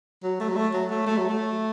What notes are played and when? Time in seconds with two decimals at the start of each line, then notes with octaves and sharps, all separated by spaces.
0.23 F#3
0.40 A3
0.48 F#3
0.56 A3
0.74 F#3
0.90 A3
1.07 A3
1.17 F#3
1.29 A3